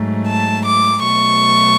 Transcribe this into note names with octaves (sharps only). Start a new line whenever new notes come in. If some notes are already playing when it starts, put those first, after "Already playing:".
Already playing: G#2 F#3 A3
A5
D6
B2 F#3 A3 C#6